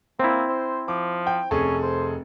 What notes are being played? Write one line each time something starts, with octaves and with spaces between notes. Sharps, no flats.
A#3 C4 E4
C5
F3 D6
G5
F1 C#4 G#4 A4
C5